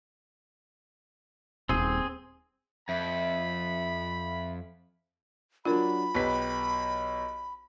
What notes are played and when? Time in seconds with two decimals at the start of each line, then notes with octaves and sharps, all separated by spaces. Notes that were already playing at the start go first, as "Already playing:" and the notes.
1.69 D#1 C4 G#4
2.89 F2 E5 B5
5.65 F#3 D4 F4 A#4 B5
6.15 B1 G4 B4 B6